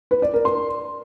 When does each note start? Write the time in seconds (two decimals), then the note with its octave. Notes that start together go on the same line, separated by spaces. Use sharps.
0.11 B4
0.22 D5
0.34 A#4
0.45 C6